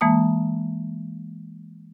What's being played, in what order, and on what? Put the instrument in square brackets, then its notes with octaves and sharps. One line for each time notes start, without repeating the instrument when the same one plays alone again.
[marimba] E3 G#3 A#3 A5 D#6